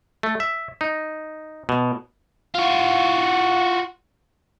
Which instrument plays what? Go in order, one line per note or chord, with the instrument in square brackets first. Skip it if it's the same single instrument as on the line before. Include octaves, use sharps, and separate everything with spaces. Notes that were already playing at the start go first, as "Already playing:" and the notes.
[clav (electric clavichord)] A3
E5
D#4
B2
[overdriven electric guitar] F4 F#4